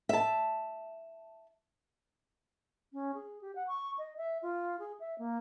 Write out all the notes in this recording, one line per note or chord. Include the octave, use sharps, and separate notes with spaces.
E5 A5
C#4
G#4
G4
F#5
C#6
D#5
E5
F4
G#4
E5
A#3